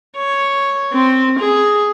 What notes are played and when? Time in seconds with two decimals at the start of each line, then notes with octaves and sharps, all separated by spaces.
0.17 C#5
0.93 C4
1.39 G#4